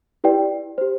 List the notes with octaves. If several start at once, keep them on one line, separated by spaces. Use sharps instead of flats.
E4 G4 B4 D5 G5
G4 C5